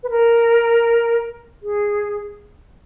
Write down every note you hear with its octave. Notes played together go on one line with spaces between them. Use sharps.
B4
A#4
G#4